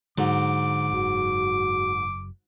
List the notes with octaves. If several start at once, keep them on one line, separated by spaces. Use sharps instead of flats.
G#2 D3 F#3 D6
F#1 F#4